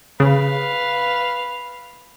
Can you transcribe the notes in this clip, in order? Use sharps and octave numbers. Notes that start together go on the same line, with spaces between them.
C#3 B4 F5